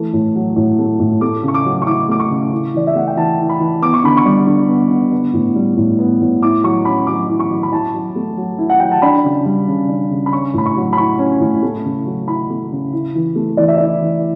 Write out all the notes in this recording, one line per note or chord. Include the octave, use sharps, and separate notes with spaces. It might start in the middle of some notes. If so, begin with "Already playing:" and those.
Already playing: E3 A3
A2
F#3
A2
A3
A2
A3 D6
C#3 C#6
D6
F#3
C#6
E4 D6
A3 D6
C#6
C#3
E4
E3 D5
E5
A3 F#5
G5
E3 A5
E4
B5
E3
B3 D6
C#6
D3 B5
C#6
G3
D3
B3
D3
B3
A2
G3
A2
B3
A2
E4 D6
F#3 C#6
C#4 B5
F#3 D6
E4
C#6
F#3
B5
E4 A5
F#3
A3
F#3
E4
F#5
F#3 G5
A5
D4 B5
C#3
G3
C#3
D4
C#3
B5
C#4 C#6
A2 B5
C#6
F#3
B5
E4 C#6
C#4
A2
A3
C#3
F#3
E4 B5
A3
C#3
E4
E3
A3
E3 D5
E5
E4 D5
E3